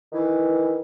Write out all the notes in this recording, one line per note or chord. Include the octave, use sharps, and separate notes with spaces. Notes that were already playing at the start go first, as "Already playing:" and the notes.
D#3 E3